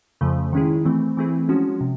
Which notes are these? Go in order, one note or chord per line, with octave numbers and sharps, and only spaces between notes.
F2 C#3 F3 A3
D#3 G#3 C#4 E4 G#4
E3 A3 C4
E3 A3 C4 E4 G#4
F3 G#3 C#4 F#4
C3